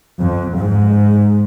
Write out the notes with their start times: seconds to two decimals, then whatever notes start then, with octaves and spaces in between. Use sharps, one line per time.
0.19 F2
0.55 G#2